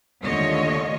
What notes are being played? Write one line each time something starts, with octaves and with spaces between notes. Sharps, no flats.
D#2 D3 A3 F4 C#5 D#5